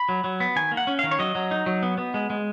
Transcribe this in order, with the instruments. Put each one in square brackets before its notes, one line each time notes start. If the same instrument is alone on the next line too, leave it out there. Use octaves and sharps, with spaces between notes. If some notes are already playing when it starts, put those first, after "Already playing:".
Already playing: [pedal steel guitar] B5
F#3
F#3
B3
D#3 G#5
A#3
F#5
C#4
D#3 F5
C#5
F#3 D#5
F#3
D#4
F#3
B3
B3
G#3
G#3